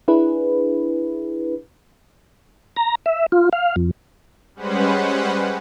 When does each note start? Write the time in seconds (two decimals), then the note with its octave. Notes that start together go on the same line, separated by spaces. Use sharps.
0.08 D4 E4 G#4 B4
2.77 A#5
3.06 E5
3.32 F4
3.53 F5
3.76 F2
4.55 G3 G#3 C#4 B4 C5 F#5